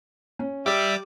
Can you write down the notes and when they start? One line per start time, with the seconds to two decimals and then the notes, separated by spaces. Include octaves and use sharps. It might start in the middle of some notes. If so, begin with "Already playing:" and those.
0.39 C#4
0.66 G3 G4 D5 E5 D6